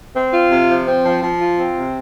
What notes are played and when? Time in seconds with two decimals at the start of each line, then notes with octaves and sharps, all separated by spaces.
0.15 C4
0.33 F4
0.51 C3
0.69 F3
0.87 C4
1.05 F3
1.23 F3
1.40 F4
1.59 C4
1.77 C3